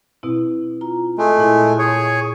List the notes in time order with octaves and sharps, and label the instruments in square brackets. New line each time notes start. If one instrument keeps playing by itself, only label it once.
[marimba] B2 C4 E4
F4 A#5
[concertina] G#3 A3
[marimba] A#2 E4
[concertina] G#4 C#5